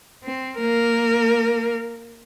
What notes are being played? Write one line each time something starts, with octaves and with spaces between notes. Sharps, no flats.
C4
A#3 A#4